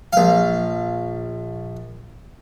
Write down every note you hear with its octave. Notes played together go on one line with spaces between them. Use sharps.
A#1 F5